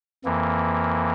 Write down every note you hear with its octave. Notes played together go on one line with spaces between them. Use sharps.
F2 E3 A#3